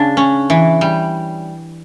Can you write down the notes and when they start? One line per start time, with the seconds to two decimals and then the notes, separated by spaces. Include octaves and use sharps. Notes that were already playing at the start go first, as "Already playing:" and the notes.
Already playing: C#3 D4
0.17 C#4
0.50 E3
0.81 G3